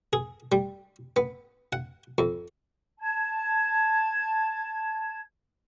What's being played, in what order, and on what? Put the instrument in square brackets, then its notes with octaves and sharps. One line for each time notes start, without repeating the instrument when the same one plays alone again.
[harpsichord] G#4
G3
B3
F#5
F2
[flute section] A5 G#6